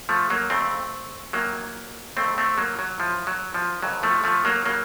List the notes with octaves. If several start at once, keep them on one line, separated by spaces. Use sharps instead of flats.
F3 A3
F#3 A#3
F2 C#3 A3 C4
F#2 D#3 F#3 A#3
F2 D#3 A3 C4
A3 C4
F#3 A#3
F#3
A2 F3
F#3
F3
F2 C3 D#3 F#3
F3 A3
F3 A3
F#3 A#3
C#3 F#3 A#3